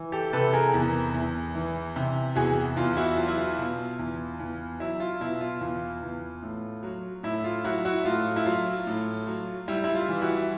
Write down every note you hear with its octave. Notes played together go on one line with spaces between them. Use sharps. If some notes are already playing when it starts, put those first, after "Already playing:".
Already playing: E3
G4 A4
C3 A4 B4
G#4 A#4
E2
E2
E3
C3
E2 F#4 G#4
E2 F4
E4 F#4
F#3 F4
E4
F4
B2
E2
E2
F#3 E4
F4
B2 E4
F4
E2 F4
E2
A2
F#3
A2 E4
F4
F#3 E4 F#4
E4 F#4
A2 F4
E4
F#3 F4
A2
F#3
G3 E4
E4
F4
E3
E4 F#4